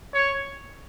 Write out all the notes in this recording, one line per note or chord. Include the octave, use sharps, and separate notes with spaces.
C#5